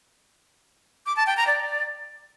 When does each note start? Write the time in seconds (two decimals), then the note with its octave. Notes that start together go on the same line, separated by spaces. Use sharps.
1.06 D6
1.16 A5
1.27 G5
1.37 A#5
1.47 D5